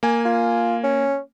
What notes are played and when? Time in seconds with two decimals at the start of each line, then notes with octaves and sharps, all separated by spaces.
0.03 A#3 G#5
0.25 F4
0.84 C#4